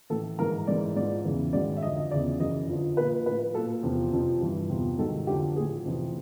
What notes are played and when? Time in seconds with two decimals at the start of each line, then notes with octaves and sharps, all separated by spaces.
0.10 A2 E3 A4
0.39 G#2 E3 A#4
0.67 G#2 E3 D5
0.96 G#2 F3 D5
1.25 E2 C#3 E3
1.53 G#2 D#3 F#3 D5
1.77 E5
1.82 F2 D3 F3 D#5
1.97 D#5
2.11 E2 C#3 F3 D5
2.39 F#2 C#3 E3 D#5
2.68 F2 D3 F3
2.97 A#2 F3 B4
3.26 A2 F3 B4
3.54 A#2 F#3 A4
3.83 E2 C3 F3
4.13 F2 C3 F3
4.41 G2 E3
4.69 E2 C3 F3
4.98 G#2 D#3 F#3 A4
5.27 F2 D3 F#3 G4
5.55 A2 F3 G#4
5.85 F2 C3 E3